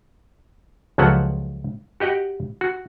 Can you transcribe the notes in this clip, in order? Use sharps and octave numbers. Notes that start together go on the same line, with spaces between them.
C#2 F3 F#3 A4 B4 F#5
F#4 G4 D#5 F#5 G5
F#4